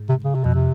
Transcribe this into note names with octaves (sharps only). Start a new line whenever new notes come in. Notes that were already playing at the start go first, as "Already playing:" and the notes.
Already playing: G#2
C3
C#3
C3
F2 B2
C3